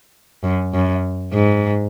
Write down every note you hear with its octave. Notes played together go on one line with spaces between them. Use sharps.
F#2
F#2
G#2